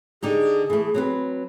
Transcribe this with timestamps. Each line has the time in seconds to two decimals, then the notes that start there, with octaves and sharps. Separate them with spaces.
0.22 D3 D#4 G4 G#4
0.70 E3 A3
0.94 F#3 C4 B4